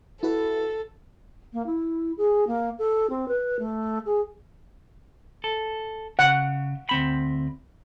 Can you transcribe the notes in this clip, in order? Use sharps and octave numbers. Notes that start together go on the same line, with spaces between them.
E4 F#4 A4 B4
A#3
E4
G#4
A#3
A4
C4
B4
A3
G#4
A4
C#3 F#5
D2 C4 B5